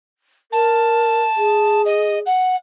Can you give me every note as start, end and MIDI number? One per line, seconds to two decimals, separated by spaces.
0.52 1.22 70
0.52 1.82 81
1.37 2.18 68
1.85 2.19 75
2.26 2.56 78